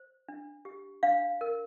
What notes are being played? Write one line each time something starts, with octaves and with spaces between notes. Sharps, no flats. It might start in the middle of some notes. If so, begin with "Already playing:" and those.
Already playing: C5
D4
G4
D4 F5
A#4